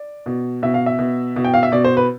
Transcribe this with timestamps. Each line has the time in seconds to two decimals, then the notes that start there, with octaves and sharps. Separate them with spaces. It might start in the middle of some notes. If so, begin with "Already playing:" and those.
Already playing: D5
0.26 B2
0.63 B2 E5
0.74 F5
0.86 E5
0.99 B2
1.36 B2
1.44 G5
1.54 F5
1.63 E5
1.72 B2 D5
1.84 C5
1.97 B4